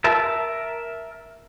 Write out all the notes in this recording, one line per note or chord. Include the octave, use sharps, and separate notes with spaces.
A#4 E5 A5